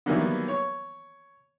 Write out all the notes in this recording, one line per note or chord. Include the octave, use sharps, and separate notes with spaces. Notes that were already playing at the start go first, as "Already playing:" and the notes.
D#3 E3 F#3 G3 A#3 B3
C#5